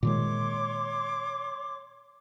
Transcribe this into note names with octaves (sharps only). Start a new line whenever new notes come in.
A#2 D#3 G#3 C#5 C6 D6